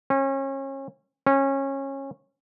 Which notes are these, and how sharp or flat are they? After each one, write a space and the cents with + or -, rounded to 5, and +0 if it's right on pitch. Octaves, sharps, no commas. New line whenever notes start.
C#4 -30
C#4 -20